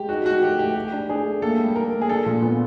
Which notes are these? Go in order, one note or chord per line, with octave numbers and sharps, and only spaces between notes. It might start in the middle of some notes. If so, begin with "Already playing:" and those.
Already playing: G#3 G4
D#4 F#4
D#4 F#4
A3 G4
A3 G4
A3 G4
D4
D4 G#4
A3
A#3 A4
G3
A#3 A#4
A#3
G#4
D4 A4
A#2
B3